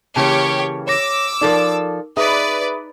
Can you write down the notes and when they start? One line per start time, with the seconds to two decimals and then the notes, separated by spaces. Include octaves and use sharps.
0.16 C#3 E3 A#3 G4 C#5 A5
0.87 C#5 D6 E6 A#6
1.41 F3 D#4 A4 A#4 D5
2.17 D#4 G#4 B4 D5 E5 D#6